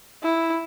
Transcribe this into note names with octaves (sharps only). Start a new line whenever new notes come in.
E4